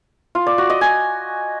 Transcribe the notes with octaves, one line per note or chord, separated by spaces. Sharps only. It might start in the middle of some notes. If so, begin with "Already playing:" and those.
F4
D5
F#4
D#5
G#5